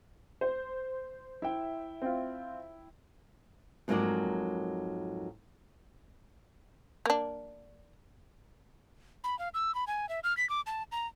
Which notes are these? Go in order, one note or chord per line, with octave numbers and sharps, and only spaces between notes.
C5
E4 E5 G5
C4 F4
F2 G#2 F#3 A#3 A#4 D5
A#3 D4
B5
F5
E6
B5
G#5
E5
F6
B6
D6
A5
A#5